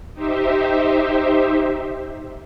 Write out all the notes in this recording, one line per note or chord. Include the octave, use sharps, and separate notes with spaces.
D#4 G4 C5 E5